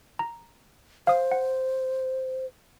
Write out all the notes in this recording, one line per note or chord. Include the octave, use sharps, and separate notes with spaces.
A#5
C5 F5 D#6
F#5